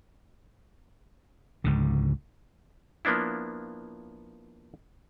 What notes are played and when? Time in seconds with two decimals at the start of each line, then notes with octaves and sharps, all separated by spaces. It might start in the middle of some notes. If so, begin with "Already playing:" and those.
1.64 C#2 G#2 D3
3.05 F3 A#3 B3 D4 E4